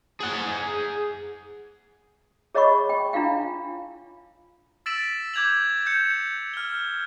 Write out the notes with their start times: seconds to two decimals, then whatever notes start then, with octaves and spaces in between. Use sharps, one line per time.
0.21 G#4 F#5
2.55 G#4 C#5 D#5 F#5 B5 C#6
2.89 G5
3.13 D4 E4 F4 F5 G5
4.86 E6 A6 B6 D7 E7 F#7
5.34 D6 G6 G#6 F7 F#7
5.86 G6 C#7
6.54 F6 G7